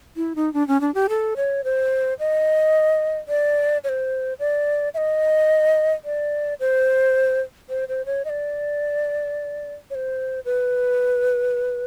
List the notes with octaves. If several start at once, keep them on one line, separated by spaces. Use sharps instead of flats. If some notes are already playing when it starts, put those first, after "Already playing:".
E4
D#4
D4
C#4
D4
G4
A4
C#5
C5
D#5
D5
C#5
C5
D5
E5
D#5
D5
C5
C5
C5
C#5
D#5
D5
C#5
C5
B4